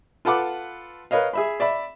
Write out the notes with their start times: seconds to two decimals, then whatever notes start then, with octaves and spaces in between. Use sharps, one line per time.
0.25 F4 A4 B4 F#5 D6
1.11 A#4 B4 C#5 D#5 F5
1.33 G#4 E5 B5
1.60 D5 E5 B5